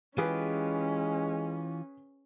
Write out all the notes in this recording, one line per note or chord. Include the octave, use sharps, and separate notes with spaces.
E3 G#3 C#4 F4 G4 G#4 B4